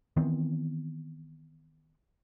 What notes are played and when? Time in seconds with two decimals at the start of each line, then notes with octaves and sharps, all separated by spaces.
0.17 D#3 E3 B3 C4